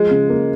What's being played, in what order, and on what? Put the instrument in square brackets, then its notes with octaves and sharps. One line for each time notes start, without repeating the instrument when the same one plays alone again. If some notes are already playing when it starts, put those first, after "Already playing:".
Already playing: [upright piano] F3 [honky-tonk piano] G#3
[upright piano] C#3
A#3